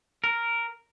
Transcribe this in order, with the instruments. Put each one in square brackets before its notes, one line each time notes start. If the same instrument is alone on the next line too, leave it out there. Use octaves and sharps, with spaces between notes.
[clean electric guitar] A#4